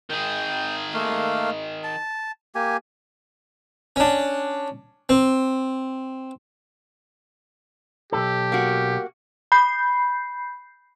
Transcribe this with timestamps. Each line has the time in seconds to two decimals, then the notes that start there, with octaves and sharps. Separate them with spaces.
0.10 D#3 G#4 G5
0.93 A3 A#3 F5
1.84 A5
2.55 A#3 G4 G#5
3.96 C#4 D4
5.09 C4
8.12 B1 F#2 G4 A4
8.52 A#3 F#4
9.52 B5 G6 C7